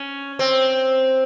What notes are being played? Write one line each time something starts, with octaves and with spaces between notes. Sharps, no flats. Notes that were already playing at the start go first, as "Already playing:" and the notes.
Already playing: C#4
C4